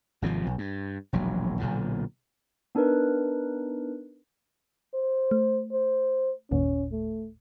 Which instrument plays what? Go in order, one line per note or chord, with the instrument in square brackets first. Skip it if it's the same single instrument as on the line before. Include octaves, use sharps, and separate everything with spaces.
[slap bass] G#1 C3 D#3 F3
B1
G2
E1 A#1 F#3
B1 A#2 D3
[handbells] B3 D4 D#4 A#4 B4
[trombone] C5
[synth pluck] A3
[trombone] C5
[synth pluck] G1 D#2 A#2 [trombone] C#4
[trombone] A3